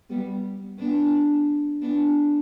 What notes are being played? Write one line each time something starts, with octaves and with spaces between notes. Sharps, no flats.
G3 B3
B3 D4
B3 D4